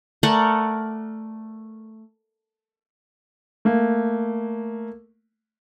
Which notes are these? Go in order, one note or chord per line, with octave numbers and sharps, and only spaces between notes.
A3 A#4 D5 F#5
A3 A#3